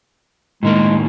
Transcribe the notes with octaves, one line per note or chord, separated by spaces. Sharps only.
A2 D#3 G#3 A#3